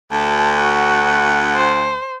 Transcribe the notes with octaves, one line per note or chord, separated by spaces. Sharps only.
D2 A5
F#4 F#5
C5